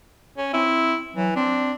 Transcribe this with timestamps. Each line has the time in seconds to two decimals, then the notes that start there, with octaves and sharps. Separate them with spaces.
0.37 C#4
0.53 C4 E4
1.15 E3 F#3
1.36 C4 D4